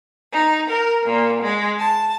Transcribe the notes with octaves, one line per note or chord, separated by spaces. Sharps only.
D#4
A#4
A#2
G#3
A5